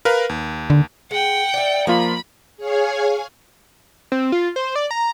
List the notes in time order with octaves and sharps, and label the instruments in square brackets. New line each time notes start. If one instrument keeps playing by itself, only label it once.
[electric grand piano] A#4 B4 F5
D#2
[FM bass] D3
[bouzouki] G#3 [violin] F#5 G5
[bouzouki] D5 E5
[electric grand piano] F3 A#3 F4 [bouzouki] A#4 [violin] B5
[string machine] G#4 C#5 F5 G#5
[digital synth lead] C4
F4
C5
D5
A#5